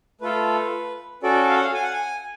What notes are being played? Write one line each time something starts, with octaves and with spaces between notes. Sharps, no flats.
A3 F4 A4 B4
C#4 F#4 A4 D5
F5
F#5
F5
G#5
F#5
G#5